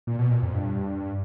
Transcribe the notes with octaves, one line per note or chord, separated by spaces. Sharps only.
A#2
B2
A#2
F2
G2